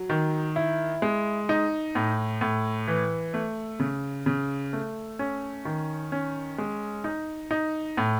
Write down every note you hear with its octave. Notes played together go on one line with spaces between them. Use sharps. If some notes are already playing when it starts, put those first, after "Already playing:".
Already playing: F#3
D#3
E4
G#3
D#4
A2
A2
E3
A3
C#3
C#3
A3
C#4
D#3
C#4
G#3
D#4
D#4
A2